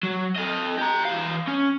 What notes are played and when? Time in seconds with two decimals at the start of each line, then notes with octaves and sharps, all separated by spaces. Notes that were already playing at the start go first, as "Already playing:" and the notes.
0.03 F#3
0.36 A4 D#5
0.78 G4 A#5
1.05 E3 F5
1.48 C#4